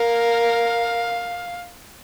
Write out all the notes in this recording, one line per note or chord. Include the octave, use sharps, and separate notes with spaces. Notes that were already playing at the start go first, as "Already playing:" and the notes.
Already playing: A#4 F5